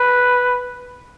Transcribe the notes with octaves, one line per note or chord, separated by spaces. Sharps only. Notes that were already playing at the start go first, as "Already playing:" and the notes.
Already playing: B4